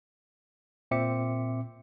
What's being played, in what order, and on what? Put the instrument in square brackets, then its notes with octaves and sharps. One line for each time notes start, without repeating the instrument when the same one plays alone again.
[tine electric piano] A#2 C4 E5 D6 C#7